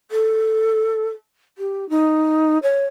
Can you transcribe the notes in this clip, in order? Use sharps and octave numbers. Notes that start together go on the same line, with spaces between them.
A4
G4
D#4
C#5